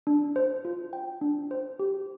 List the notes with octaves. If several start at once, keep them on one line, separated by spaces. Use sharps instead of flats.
D4
C5
F4
G5
D4
C5
G4